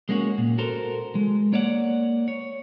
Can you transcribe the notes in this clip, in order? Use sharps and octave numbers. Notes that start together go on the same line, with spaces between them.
G#3 A#3 C#4 F#4
A#2
F#4 A4 A#4 C5
G#3
A#3 C#5 D5 F5 F#5
C#5